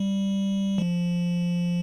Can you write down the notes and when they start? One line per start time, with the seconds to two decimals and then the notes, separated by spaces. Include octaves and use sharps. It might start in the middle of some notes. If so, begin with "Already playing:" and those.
Already playing: G3
0.78 F3